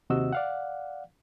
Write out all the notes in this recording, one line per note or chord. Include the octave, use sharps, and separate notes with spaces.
D#2 C3 F#4 D#5 E6
D5 F5 F#5